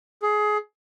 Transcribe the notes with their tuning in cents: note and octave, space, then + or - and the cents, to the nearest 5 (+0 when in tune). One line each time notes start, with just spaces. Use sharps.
G#4 +20